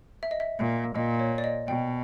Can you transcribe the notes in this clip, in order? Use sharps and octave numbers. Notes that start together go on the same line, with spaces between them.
E5
D#5
E5
A#2
A#2 D#5
C#5
D5
D#5
B2 G5